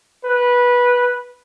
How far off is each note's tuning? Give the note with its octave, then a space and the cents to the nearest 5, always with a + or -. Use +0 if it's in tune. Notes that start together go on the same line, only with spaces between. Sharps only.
B4 -15